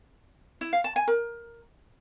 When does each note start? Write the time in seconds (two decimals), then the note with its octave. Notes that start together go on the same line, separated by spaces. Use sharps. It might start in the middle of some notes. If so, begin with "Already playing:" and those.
0.61 E4
0.73 F5
0.84 A5
0.96 G#5
1.08 A#4